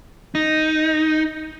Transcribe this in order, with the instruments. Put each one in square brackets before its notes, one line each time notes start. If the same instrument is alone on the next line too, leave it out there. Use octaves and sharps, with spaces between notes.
[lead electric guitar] D#4